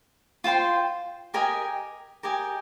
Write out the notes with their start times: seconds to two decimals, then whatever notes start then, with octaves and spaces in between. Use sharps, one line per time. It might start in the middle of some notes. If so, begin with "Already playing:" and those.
0.44 F4 C5 G5 C6
1.34 G4 A#4 D#5 G#5
2.23 G4 A#4 D#5 G#5